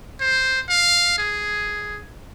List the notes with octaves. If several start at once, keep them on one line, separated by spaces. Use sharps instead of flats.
C5
F5
G#4